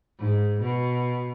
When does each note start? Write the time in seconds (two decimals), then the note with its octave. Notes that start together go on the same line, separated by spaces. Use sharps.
0.19 G#2
0.61 B2